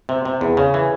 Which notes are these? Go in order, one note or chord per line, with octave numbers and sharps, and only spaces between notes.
C3
C3
E2
C#3
E3